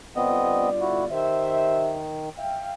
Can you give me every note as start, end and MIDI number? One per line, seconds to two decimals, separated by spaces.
0.16 1.08 31
0.16 0.70 59
0.16 0.70 60
0.16 1.08 65
0.16 1.08 74
0.16 0.70 75
0.81 1.05 64
0.81 1.05 66
1.11 2.29 51
1.11 1.98 67
1.11 1.98 72
1.11 1.98 76
2.37 2.73 76
2.37 2.73 77
2.37 2.73 79